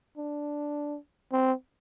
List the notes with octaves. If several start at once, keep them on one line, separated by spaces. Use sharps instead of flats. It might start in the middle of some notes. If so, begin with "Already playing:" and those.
D4
C4